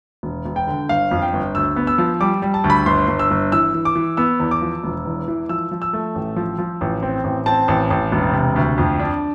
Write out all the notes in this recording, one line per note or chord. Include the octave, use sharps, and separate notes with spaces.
E1
E1
G5
D3
G1 F5
F2
G5
G1
D2 E6
B3
E6
F3
G3 D6
G3
A5
D2
B5
G1 C6
G1
E6
G1
E3 E6
E3
D6
E3
B3 E6
E2
D6
F3
E1
E2
E3
F3 E6
F3
E6
A3
A1
F3
F3
A1
C4
A1
C4 A5
A1
A1
E1
C3
D2
F2
D4